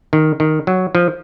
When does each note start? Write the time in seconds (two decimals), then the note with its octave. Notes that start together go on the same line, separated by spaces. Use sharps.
0.13 D#3
0.40 D#3
0.67 F#3
0.95 F3